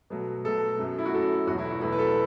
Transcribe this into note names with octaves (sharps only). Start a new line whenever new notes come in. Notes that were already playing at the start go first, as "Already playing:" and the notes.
B2 F#3 A3
B2 F#3 A3 A4
F#2 F#3 A3
E4
F#4
F#2 F#3 A3 A4
E2 B2 F#3 A3 F#4
E4
F#4
E2 B2 F#3 A3 E4
B4
A4